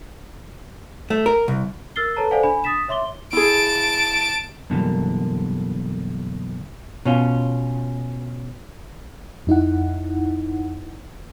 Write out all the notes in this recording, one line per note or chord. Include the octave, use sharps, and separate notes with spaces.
A3
A#4
C2
A#4 E6 F6 A6 C7 G7
A4 B4 C#5 A5 A#5
A4 C5 D5 F5 F#5 G#5
D4 G#5 B5
D#6 A6 B6 E7
C#5 E5 C6 D6 G7
E4 G#4 A5 D7
F#2 B2 D3 E3 G3 A#3
B2 C#4 F4
F2 D#4 E4 F#5